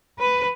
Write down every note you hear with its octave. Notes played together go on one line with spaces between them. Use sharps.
B4